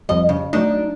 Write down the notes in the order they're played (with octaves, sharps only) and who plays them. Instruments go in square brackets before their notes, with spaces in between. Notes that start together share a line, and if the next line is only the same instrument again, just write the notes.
[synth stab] F2 F3 G3 [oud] D#5
[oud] C#3
[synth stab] F#3 A3 D#4 [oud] D4